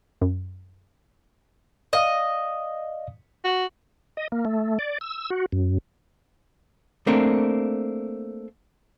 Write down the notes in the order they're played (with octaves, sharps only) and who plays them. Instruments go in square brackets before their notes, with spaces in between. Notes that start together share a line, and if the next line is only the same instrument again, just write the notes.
[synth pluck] F#2
[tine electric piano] D5 F5 D#6 [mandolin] D#5
[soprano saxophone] F#4
[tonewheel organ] D#5
A#3
A3
D5
E6
F#4
F#2
[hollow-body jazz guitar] A3 A#3 C4 D4